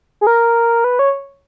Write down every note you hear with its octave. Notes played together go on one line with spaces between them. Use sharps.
G#4
A#4
B4
C#5